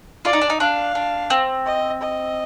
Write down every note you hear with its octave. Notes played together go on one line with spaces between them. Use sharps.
F4 D5
D#4
D4
D#4
D4 F5
D4
C4
D#5
D#5